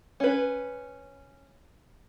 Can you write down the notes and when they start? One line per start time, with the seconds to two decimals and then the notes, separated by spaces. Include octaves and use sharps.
0.20 C#4 B4